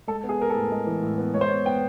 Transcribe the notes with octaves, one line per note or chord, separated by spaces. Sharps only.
G#3 A4
B3
G#4
B3 A#4
A4
A2
G#3
E3
A2
B3
G#3 C#5
C5
B3 C#5
B3 G5